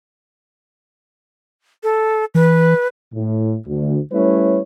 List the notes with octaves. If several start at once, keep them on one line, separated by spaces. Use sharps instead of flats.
A4
E3 B4
A2
D2
G3 A3 C#4 E4 B4 C#5